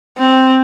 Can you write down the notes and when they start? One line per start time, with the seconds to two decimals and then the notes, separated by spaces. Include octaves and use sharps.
0.18 C4